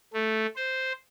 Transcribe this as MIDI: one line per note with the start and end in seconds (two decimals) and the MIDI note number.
0.13 0.46 57
0.56 0.93 72